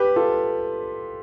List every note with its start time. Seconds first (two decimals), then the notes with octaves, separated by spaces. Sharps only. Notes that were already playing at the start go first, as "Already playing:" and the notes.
Already playing: G4 B4
0.16 F4 A4